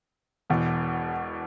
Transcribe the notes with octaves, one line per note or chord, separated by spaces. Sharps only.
E1 E2 B2